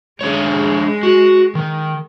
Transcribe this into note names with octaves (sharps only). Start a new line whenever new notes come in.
G#3 D4 G#4 C#5
F#4
D#3